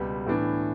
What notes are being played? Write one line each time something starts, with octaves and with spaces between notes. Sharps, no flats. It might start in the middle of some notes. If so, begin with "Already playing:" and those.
Already playing: C#2 B2 G3 B3
A2 E3 B3 D4